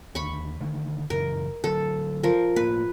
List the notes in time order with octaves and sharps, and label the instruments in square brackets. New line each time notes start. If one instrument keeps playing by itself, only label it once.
[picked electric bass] D#2 D3 [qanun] B5 C#6
[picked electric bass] D3 D#3 A3
[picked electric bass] F#2 C#3 E3 [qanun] A#4
[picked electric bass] D3 F#3 [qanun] A4
[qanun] F3 A#4
[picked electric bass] A2 A#3 [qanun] B4